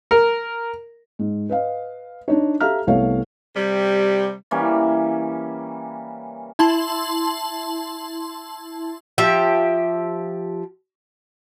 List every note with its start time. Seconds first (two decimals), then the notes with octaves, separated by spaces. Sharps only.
0.11 A#4
1.19 G#2
1.49 B4 D#5 F5
2.28 D4 D#4 C#5
2.60 G4 A4 E5 F5 A#5 F6
2.87 C2 A3 B3 C#5 F5
3.55 C3 G3
4.51 E3 G3 A#3 C#4
6.59 E4 A5 C6 F#7
9.18 F3 G4 E5